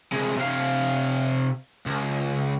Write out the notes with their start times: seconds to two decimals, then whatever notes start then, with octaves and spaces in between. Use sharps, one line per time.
0.13 C2 G#3
0.37 C3 F5
1.86 C#2